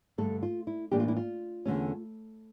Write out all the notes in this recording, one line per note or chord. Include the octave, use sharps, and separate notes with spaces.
G2 D3 A3 A4
F4
E4
A2 E3 A#3 D4 G4
F4
E4
F4
E2 D3 A3 C#4